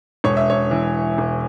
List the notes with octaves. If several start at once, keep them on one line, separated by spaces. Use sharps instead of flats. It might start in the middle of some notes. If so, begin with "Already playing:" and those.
E1 C#5
E5
C#5
E3
E1